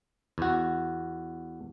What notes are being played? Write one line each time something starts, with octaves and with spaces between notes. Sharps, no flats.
E2 F#4